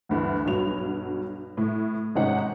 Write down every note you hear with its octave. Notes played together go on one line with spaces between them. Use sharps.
D2 G2 E3
B1 G2 F#3 F7
A2
G#1 C3 G#3 C#4 D#4 F#5